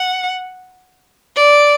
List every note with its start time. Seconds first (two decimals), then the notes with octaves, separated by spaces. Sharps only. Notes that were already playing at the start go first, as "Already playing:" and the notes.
Already playing: F#5
1.36 D5